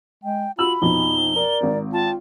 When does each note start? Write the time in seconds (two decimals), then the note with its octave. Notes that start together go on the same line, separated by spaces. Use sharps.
0.24 G#3 G5
0.59 F4 F#4 B5 E6 F#7
0.82 A#1 F2 B2 D#4 G7
1.36 A#4 D5
1.60 G#1 C4
1.93 F4 G5 A5